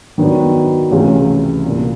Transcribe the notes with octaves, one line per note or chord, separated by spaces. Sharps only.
D#3 F#3 B3 D4
C#2 C3 E3 A3 C#4
C2 A#2 F#3